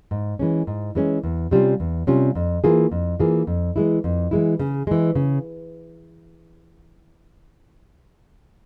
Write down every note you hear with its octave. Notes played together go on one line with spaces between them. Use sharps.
G#2
E3 G#3 C#4
G#2
E3 G#3 C#4
E2
C3 G3 C#4 F4
E2
C3 G3 C#4 F4
F2
E3 A#3 F4 G#4
F2
E3 A#3 F4 G#4
F2
E3 G#3 E4
F2
E3 G#3 E4
C#3
E3 G#3
C#3